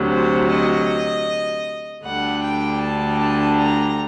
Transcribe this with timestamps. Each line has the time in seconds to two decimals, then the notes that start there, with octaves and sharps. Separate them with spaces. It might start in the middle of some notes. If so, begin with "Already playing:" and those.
Already playing: D2 C3 F#3
0.13 C5
0.51 D#5
2.06 D2 D3 G3 F#5
2.43 G5
2.82 A5
3.20 A5
3.59 A#5